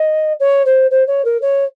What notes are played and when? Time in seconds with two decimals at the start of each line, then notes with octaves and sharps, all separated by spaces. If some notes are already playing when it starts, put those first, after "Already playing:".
Already playing: D#5
0.40 C#5
0.65 C5
0.91 C5
1.07 C#5
1.25 A#4
1.41 C#5